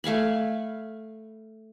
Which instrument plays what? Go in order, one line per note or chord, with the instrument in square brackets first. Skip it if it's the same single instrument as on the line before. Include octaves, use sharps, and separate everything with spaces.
[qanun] A3 F5 G#5 B5